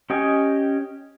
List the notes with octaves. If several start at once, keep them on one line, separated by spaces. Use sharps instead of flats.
C#4 G4 D#5 G5 G#5